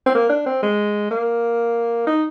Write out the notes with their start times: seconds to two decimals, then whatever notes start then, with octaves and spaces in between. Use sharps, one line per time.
0.06 C4
0.15 A#3
0.30 D4
0.46 C4
0.63 G#3
1.11 A#3
2.07 D#4